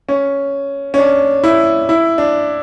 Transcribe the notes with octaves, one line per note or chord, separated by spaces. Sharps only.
C#4
C#4
D4
E4
E4
D4